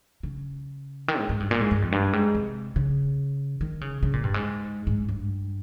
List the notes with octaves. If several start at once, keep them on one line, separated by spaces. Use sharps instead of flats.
C#3
D#3
G#2
G#2
G2
A#2
G#2
G2
F2
G2
G#2
C3
C#3
D#3
C#3
C#3
A#2
G2
G#2
G#2
G2